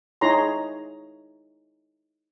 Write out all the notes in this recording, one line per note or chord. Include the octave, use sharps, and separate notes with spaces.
D#4 E4 G#4 C#5 A#5 C6